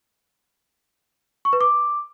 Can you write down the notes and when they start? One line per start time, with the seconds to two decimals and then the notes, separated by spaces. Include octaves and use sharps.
1.45 C#6
1.53 B4
1.61 D6